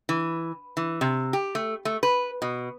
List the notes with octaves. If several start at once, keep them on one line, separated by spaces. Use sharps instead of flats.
E3
E3
C3
G4
A3
A3
B4
B2